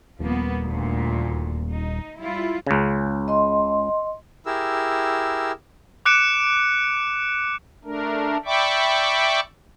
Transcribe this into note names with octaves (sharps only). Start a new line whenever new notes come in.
D#1 F3 A#3 B3
D2 A#2
D#4
G3 E4 F4
C#2 C#3
D#5 C6
E4 G4 G#4 A#4 E6
D6 F#6 C#7 D7 E7
A3 D4 A#4
D5 E5 G5 B5 C#6 D6